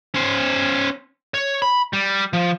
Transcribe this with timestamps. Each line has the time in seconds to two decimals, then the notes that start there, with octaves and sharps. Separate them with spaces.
0.14 C#4 C5
1.34 C#5
1.62 B5
1.93 G3
2.33 F3